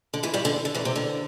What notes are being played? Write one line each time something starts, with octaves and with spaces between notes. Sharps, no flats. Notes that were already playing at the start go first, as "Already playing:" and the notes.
D3
E2 E3
G2 G3
D3
D3
E2 E3
C3
D3